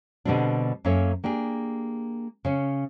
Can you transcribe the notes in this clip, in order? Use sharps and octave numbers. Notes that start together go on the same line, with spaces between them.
B2 D3 G3 C4 D4
F#2 A#3 C#4 A4 C#5 E5
A#3 D4 G4 G#4
C#3 C#4